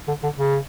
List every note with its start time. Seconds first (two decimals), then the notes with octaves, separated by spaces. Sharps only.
0.08 D3
0.23 D3
0.38 C#3